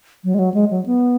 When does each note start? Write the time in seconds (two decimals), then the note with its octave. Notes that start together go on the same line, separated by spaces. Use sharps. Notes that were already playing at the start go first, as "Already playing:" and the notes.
0.24 F#3
0.34 G#3
0.39 F#3
0.54 G#3
0.70 F#3
0.86 B3